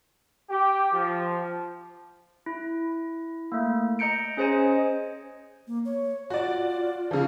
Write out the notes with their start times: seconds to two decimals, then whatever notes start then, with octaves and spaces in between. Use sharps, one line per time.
0.50 G4
0.92 F3
2.46 E4
3.52 A3 A#3
3.99 D#5 A#5 G6 C#7 D7
4.37 C#4 G#4 C5 D#5 G#5
5.67 A#3
5.85 C#5
6.30 F4 F#4 D5
7.11 C#3 F3